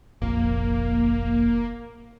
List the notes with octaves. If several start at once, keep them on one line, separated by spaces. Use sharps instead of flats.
F1 A#1 A#3